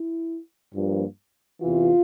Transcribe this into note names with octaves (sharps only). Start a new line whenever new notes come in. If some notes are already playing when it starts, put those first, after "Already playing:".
Already playing: E4
G2 F3 A#3
E2 C3 E3 F4